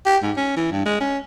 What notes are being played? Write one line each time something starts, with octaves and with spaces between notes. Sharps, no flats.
G4
G#2
C#4
E3
G2
G#3
C#4